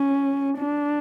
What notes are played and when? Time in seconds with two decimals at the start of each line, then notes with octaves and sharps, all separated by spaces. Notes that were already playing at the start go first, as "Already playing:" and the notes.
Already playing: C#4
0.58 D4